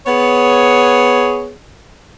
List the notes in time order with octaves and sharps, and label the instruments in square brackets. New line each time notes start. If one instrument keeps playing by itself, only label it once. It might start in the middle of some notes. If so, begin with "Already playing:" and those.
[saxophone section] B3 G#4 C#5